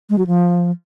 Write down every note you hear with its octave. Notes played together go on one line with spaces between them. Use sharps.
G#3
F#3
F3